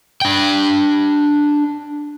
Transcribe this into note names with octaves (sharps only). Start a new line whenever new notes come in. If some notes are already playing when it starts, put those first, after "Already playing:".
D4 G5